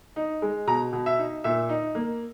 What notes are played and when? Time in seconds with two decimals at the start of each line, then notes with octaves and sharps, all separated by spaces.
0.16 D#4
0.42 G#3
0.67 B2 A#5
0.93 B2
1.06 E5
1.18 D#4
1.44 A#2 E5
1.69 D#4
1.95 A#3